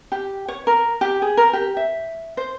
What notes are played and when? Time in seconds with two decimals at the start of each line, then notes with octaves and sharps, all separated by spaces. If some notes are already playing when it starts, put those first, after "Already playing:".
0.12 G4
0.48 C#5
0.67 A#4
1.01 G4
1.22 G#4
1.37 A#4
1.53 G4
1.77 E5
2.37 C5